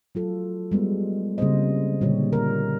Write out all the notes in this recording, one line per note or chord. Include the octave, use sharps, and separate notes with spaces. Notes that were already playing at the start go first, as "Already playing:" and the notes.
F#3 F4 A4
G3 G#3 B3
C#3 G3 A#3 C4 C5 D#5
A#2 D3 G3 G4 C#5
A#4